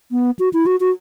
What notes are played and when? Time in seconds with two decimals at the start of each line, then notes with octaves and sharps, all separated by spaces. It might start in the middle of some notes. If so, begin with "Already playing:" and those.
0.11 B3
0.39 F#4
0.53 E4
0.66 F#4
0.80 F#4